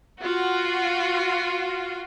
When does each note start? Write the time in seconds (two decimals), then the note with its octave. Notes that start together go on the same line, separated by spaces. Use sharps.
0.20 F4 F#4